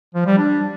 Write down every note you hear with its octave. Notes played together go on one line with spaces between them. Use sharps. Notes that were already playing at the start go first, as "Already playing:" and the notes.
F3
G3
D4